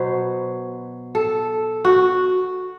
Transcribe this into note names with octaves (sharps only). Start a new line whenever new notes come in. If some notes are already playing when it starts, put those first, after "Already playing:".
Already playing: B2 F#3 B3 C5
A4
F#4